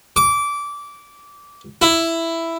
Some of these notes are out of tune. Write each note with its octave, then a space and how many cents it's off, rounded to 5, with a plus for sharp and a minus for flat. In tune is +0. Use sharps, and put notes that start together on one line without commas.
D6 -20
E4 +5